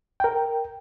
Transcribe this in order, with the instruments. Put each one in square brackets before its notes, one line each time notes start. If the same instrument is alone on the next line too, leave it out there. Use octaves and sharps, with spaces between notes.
[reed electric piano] A#4 G5